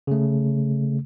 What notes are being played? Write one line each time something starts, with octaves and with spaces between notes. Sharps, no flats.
C#3 A3